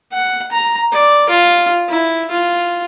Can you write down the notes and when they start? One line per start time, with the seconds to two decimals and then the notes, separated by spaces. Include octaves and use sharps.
0.13 F#5
0.52 A#5
0.92 D5
1.30 F4
1.89 E4
2.31 F4